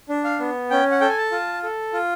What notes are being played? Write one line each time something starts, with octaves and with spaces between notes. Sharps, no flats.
D4
F5
B3
C#4 G5
F#5
A4 G5
G#5
A5
F4
A4
F4